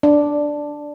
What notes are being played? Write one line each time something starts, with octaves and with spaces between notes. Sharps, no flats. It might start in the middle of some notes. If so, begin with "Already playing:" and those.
D4